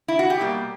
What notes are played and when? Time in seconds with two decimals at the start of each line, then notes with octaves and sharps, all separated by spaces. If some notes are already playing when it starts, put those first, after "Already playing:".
0.08 E4
0.19 F#4
0.30 G4
0.39 B2 G3 A#3